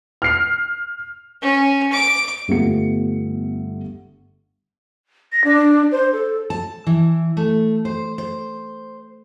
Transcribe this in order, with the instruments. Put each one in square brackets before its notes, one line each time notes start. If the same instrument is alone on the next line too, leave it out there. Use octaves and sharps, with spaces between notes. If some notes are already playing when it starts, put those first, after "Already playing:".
[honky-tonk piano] F6 C7
[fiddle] C#4
D6
[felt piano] G1 G3 A3 B3 F4 C#7
[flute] A#6
D4
C5
A4
[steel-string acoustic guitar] A5
E3
A3
C5
C5